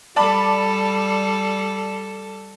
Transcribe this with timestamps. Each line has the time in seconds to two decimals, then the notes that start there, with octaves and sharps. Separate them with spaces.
0.16 G3 A4 D5 A5 B5